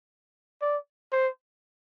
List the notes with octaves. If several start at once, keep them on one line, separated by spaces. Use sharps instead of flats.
D5
C5